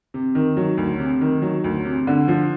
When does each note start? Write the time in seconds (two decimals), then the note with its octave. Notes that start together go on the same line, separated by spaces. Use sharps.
0.14 C3
0.35 D#3
0.57 F#3
0.77 D2
0.99 C3
1.21 D#3
1.42 F#3
1.64 D2
1.85 C3
2.07 D3
2.28 F3